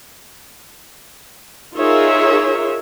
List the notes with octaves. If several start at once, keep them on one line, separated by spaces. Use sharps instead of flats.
D#4 F4 G#4 A#4 C#5 E5